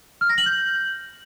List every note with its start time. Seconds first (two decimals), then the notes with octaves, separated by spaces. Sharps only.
0.21 F6
0.29 A#6
0.38 F#7
0.46 G6